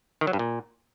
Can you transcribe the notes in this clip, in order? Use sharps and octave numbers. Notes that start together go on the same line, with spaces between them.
D#3
F#3
G2
A#2